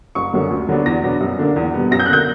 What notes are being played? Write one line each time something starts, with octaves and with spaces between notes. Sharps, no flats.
F#1 C#6
F#2 D3 F#3 A#3
D2
D3 F#3 B3 D4
E2 A#6
B2 F#3 B3 D4
F#2
D3 A#3 D4
E2
B2 G3 B3
F#2 A#6
G6
F#6
D3 A#3 G6